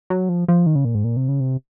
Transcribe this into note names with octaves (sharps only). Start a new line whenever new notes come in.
F#3
F3
F3
D#3
C#3
A#2
G#2
A#2
C3
C#3
C3